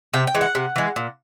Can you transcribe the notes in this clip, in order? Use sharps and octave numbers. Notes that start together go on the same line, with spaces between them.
C3 G5
G5
E3 G#3
F#5
C3
E3 G#3
A#2